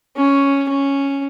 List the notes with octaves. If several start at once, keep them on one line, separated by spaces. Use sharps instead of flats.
C#4
C#4